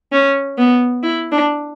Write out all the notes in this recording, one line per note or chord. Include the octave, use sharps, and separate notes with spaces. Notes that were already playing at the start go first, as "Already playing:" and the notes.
C#4
B3
E4
D4